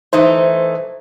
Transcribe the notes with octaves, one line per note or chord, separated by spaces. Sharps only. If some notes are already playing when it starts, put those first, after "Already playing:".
E3 A3 D#4 C5